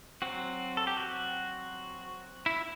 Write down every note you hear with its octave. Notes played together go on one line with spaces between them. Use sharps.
F#3 C4 F#4
A4
G4
F#4
E4